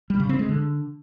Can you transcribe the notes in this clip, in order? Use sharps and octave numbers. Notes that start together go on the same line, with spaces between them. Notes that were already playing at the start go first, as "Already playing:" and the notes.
G3
C#3
C4
G#3
D3